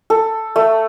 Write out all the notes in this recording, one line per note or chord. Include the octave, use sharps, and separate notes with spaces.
A4
A3